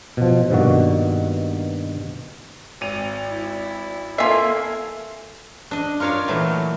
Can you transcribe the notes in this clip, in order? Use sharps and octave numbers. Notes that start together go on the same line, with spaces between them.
B2 F3
G2 B2 D#3 A#3 F#4
G#1 D#7 F7
E4
A#3 F4 A4 E5 G#5 C7
D4 D#5
F4 A#4 C#5 D5 F5
A#2 E3 F#3 A3